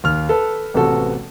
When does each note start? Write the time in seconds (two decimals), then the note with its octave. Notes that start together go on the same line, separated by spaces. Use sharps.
0.04 D#2 F6
0.29 A4 B4
0.74 A1 C3 B3 F#4 A4